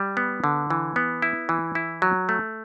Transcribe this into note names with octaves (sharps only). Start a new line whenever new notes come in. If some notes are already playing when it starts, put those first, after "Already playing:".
Already playing: G3
B3
D3
E3
B3
E4
E3
E4
F#3
A3